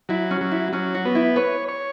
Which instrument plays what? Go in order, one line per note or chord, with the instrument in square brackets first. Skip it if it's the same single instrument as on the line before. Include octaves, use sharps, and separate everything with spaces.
[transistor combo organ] F#3 [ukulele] E4
[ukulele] C#4
[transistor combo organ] F#3
[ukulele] E4
[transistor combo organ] F#3 [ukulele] C#4
[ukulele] F#4
[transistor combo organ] B3
[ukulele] E4
[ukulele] B4 [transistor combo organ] C#5
[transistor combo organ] C#5